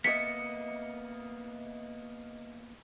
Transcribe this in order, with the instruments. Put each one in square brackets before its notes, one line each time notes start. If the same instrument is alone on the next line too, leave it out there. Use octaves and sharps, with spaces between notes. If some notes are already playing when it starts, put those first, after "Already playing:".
[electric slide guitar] A#3 B3 [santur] D#5 E5 [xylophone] B6 [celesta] C#7